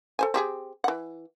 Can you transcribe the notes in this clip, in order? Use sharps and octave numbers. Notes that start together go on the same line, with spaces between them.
A4 C5 G#5
C4 G4 G#4
E3 F#5